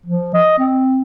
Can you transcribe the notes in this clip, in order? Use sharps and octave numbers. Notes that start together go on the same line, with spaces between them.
F3
D#5
C4